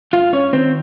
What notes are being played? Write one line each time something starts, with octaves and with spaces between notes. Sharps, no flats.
G2 F4 F5
C#4 C#5
D#3 C4 C5